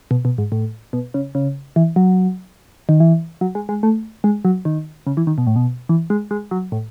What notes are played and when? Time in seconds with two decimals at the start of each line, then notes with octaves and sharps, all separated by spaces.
0.11 B2
0.25 B2
0.38 G#2
0.52 A2
0.93 B2
1.14 C#3
1.35 C#3
1.76 E3
1.96 F#3
2.89 D#3
3.00 E3
3.41 F#3
3.55 G#3
3.69 G#3
3.83 A3
4.24 G#3
4.45 F#3
4.65 D#3
5.07 C#3
5.17 E3
5.27 D#3
5.38 B2
5.47 A2
5.56 B2
5.89 E3
6.10 G#3
6.31 G#3
6.51 F#3
6.72 A2